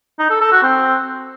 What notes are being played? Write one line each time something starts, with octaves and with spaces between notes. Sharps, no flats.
D#4
A4
A4
F#4
C4